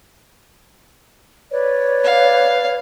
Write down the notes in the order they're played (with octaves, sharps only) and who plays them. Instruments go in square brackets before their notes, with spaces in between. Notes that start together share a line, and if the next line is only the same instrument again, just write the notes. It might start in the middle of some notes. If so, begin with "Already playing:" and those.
[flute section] B4 C#5 D5
[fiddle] F5